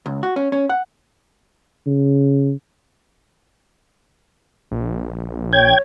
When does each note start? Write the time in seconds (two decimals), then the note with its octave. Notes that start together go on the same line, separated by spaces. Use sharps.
0.06 C#2
0.23 F#4
0.36 C#4
0.52 C#4
0.69 F#5
1.86 C#3
4.71 A#1
5.53 C#5 G5 G#6